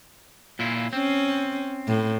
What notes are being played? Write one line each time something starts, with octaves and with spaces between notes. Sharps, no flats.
A#2 E4 F4
C4 C#4
A2